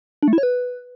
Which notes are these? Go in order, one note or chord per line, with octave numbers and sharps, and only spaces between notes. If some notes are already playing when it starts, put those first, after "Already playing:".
D4
A3
E4
C#5
B4